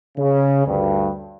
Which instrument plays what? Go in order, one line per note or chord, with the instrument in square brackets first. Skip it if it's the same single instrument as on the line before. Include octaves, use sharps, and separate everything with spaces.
[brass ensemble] C#3
D2 G2